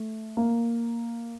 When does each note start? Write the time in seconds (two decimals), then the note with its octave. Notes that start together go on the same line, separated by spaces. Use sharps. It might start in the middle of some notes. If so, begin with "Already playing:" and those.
Already playing: A3
0.37 A#3